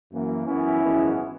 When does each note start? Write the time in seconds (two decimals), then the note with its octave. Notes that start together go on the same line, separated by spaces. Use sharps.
0.11 F#2 E3 A#3
0.46 F#2 E3 B3 C#4 E4
0.81 G#1 F#2 E3 G#3 B3